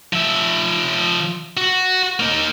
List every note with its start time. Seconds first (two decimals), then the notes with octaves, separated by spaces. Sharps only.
0.13 F3 E5
1.57 F#4
2.20 A#3 D#4